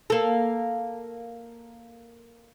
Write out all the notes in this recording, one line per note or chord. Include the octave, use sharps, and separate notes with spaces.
A#3 A4